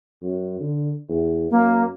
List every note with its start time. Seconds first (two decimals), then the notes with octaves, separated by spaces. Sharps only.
0.22 F#2
0.60 D3
1.08 E2
1.51 F#2 A#3